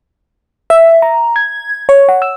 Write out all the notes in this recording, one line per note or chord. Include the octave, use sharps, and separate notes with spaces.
E5
A#5
G#6
C#5
F#5
E6